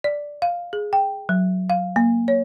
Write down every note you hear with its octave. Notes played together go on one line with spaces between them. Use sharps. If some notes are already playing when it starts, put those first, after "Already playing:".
D5
F5
G#4
G5
F#3
F5
A#3
C#5